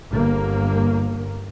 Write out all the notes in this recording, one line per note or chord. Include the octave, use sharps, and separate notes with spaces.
G1 A#3